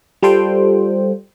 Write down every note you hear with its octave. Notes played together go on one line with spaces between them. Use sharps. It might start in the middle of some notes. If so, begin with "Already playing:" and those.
G3 F4 A4 C5 G5